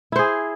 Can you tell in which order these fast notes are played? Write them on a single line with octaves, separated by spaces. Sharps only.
E4 C5 G#4